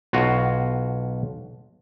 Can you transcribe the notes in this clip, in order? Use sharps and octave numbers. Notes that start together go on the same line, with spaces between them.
B1 F4 F#4